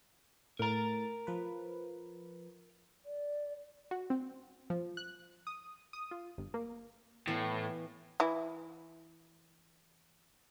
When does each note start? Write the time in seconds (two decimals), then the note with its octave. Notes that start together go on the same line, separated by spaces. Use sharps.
0.59 A2 A#4 A#5 A6
1.27 F3 B4
3.06 D5
3.91 F#4
4.10 C4
4.70 F3
4.97 F#6
5.47 D#6
5.93 D#6
6.11 F4
6.38 G1
6.54 A#3
7.28 A2 E3 B3 F5
8.20 E3 E4